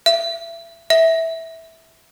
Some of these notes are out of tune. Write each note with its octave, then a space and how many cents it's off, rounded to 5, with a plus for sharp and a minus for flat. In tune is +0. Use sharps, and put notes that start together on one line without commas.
E5 +25
E5 -15